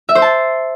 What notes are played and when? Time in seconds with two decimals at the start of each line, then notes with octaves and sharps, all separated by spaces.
0.09 E5
0.15 C5
0.22 A5